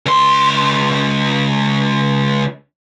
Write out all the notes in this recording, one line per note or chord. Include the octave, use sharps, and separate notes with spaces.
C#2 C6